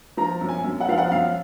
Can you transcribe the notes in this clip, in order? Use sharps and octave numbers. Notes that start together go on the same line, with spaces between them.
F3 A#5
F#2
G#5
F#2
F#5
F3 F5
F#5
F#2 F5